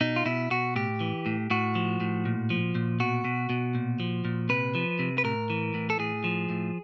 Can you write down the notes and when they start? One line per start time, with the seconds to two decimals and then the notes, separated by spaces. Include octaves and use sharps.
0.01 B2 D#4
0.16 F4
0.25 B2 E4
0.50 B2 F#4
0.76 A2 G4
1.00 E3
1.26 A2
1.50 A2 F#4
1.75 F3
2.00 A2
2.25 A#2
2.50 F3
2.75 A#2
3.00 B2 F#4
3.25 B2
3.50 B2
3.75 A#2
4.00 F3
4.25 A#2
4.49 C3 B4
4.75 F3
4.99 C3
5.18 B4
5.24 A2 A#4
5.50 E3
5.74 A2
5.90 A4
5.99 A2 G#4
6.24 F3
6.50 A2